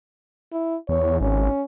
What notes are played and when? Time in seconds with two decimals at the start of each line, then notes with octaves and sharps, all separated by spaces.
0.52 E4
0.89 E2 C#5
1.21 G#1 C#4